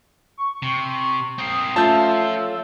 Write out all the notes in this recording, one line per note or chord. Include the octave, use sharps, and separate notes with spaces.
C#6
C3
C4 A#4 D#6
F3 A3 C#4 F4 A5 E6 G6